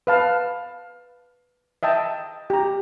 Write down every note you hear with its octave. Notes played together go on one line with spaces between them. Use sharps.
B4 F5 A5
D#5 E5 G5 A5
G4 A#5